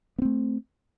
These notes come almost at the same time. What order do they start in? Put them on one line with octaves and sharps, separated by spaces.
B3 C4 A3